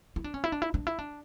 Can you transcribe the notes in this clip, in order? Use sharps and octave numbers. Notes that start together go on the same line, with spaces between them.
E4
D4
C#4
E4
D4
E4
D4
E4
D4